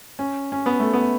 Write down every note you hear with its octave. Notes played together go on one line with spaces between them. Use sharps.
C#4
C#4
B3
A3
B3